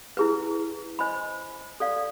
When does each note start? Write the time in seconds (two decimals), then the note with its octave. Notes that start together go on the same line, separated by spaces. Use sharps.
0.17 E4 G#4 B4
0.99 C5 D#5 G#5 B5
1.80 A4 D5 F5